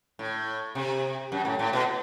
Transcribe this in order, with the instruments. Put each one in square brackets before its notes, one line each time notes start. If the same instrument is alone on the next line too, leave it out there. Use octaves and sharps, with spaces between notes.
[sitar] A2
C3
F#2
A2
A2
B2